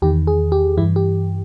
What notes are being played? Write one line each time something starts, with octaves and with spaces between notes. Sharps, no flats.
E2 D#3 G4
G#4
G4
G2 E3 E4
G4